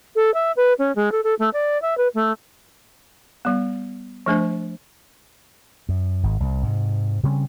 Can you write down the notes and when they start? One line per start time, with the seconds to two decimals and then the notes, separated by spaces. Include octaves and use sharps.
0.16 A4
0.34 E5
0.57 B4
0.79 C#4
0.96 G#3
1.12 A4
1.24 A4
1.39 A3
1.53 D5
1.82 E5
1.98 B4
2.15 A3
3.45 G3 B3
4.26 F3 A3 D4 C5
5.89 F#2
6.23 G#1
6.40 C2
6.63 G#2 C3
7.23 C#3 G3 C4 C#4